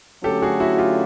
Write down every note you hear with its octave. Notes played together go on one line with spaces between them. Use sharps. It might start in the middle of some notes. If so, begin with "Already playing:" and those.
D3 F#3 A3 C#4 G4 A4
F#4 G#4
E4 F#4
F4 G4